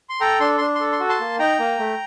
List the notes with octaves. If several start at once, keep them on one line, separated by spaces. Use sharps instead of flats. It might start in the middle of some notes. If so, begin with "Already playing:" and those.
C6
A4 G5 A#5
D4 C6
D4 C6
C6
A4
C6
F#4
A5 C6
A#3
D#4 G5 A#5
A#3
A3